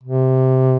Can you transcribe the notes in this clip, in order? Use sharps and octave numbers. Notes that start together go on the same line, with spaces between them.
C3